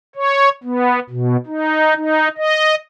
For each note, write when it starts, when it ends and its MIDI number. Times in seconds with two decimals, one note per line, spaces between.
0.15 0.49 73
0.64 1.00 59
1.10 1.36 47
1.46 1.95 63
1.96 2.28 63
2.37 2.75 75